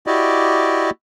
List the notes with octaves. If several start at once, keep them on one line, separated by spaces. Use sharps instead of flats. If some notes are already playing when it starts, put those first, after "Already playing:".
E4 F#4 G4 D5 D#5